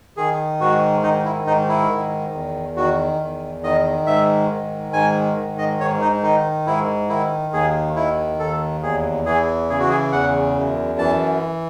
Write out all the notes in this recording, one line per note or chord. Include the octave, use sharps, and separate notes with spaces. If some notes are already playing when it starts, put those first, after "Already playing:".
D#3 G#4
G#2 F#4
D#3 D#4
E4
G#2 D#4
E4
D#3
E2
D#3 F#4
E2
D#3 D#5
G#2 E5
D#3
G#2 G#5
D#3
D#5
G#2 C#5
D#4
D#3 D#4
G#2 E4
D#3 E4
D#2 G#4
D#3 E4
D#2 A4
E2 G#4
E3 G#4
C#3 G#4
F#4
G#4
E2 F#5
F#2
E3 A5